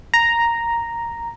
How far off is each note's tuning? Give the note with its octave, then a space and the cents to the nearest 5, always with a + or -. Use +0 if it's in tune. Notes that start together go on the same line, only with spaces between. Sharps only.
A#5 +0